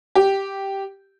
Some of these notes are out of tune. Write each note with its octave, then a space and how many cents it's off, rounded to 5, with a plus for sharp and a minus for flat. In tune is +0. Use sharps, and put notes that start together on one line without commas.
G4 -5